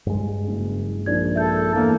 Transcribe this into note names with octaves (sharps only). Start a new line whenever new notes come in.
G2 G#3
F#1
A#1 D#4 D5 G#6
A4 E5 G6
E2 A#3